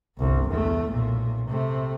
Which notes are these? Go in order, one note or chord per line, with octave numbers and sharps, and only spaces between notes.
G1 C2
E2 A3
B1 A#2
C3 A3